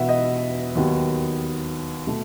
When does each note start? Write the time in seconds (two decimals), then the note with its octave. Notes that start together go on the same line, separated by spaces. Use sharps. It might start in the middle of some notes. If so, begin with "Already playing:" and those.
Already playing: E1 E2 B2 B3 E5 F#5
0.09 D#5
0.75 D#2 D#3 F#3 B3
2.07 B2 A3